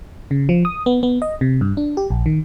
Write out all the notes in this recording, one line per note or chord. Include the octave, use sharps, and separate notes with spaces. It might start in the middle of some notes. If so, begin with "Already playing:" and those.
C#3
F3
D#6
B3
B3
D#5
C3
G2
D4
G4
A#1
D#3